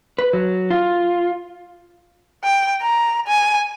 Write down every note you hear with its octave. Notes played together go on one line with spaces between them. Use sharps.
B4
F#3
F4
G5
A#5
G#5